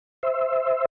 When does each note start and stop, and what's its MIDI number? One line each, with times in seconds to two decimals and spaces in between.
0.23 0.85 72
0.23 0.85 76